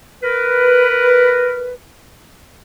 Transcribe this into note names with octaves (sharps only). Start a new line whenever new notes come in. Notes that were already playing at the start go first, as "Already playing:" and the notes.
A#4 B4